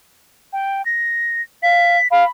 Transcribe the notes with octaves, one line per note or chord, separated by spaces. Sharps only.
G5
A#6
F5 B6
F5 B5